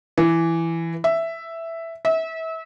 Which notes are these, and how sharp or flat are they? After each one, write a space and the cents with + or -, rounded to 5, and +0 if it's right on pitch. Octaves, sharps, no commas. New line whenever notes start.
E3 +10
E5 +5
E5 -30